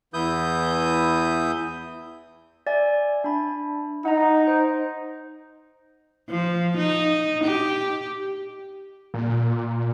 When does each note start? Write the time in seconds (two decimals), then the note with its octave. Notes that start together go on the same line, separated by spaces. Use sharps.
0.14 E2 E3 E4 D#6 G6
2.67 D5 E5 G#5
3.24 D4 B5
4.05 D#4 F#5 A#5
4.47 C5
6.30 F3
6.78 D#4
7.45 G4
9.14 A#2